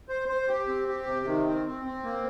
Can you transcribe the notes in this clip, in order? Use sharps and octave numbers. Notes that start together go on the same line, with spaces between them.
C5
C5
G4
C4
G4
C3
D#3
C4
C4
C4
A#3